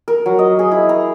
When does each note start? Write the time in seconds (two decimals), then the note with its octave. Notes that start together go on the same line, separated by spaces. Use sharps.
0.08 A#4
0.26 F#3
0.39 D#5
0.59 G#4
0.71 E4
0.89 A#5